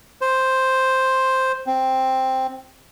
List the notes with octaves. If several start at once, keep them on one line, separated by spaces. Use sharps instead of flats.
C5
C4